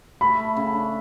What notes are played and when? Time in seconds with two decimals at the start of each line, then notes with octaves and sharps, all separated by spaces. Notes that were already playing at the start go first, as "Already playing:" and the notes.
0.21 A3 B5
0.39 A3
0.57 C#3
0.73 D4